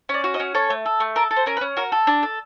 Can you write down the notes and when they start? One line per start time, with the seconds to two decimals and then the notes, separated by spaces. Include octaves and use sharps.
0.09 C#4 D5
0.24 F#4
0.34 D#5
0.40 C#4
0.55 A4 C#5
0.70 A3
0.86 A4
1.00 A3
1.16 A4 A#4
1.31 A4
1.36 C5
1.46 C#4 A#4
1.57 B4
1.61 C#4
1.77 F#4 A#4
1.92 A4
2.07 D4
2.23 A4